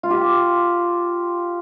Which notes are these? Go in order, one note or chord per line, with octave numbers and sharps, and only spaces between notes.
F4
G4